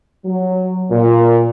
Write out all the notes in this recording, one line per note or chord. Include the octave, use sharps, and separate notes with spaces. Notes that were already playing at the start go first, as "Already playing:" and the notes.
F#3
A#2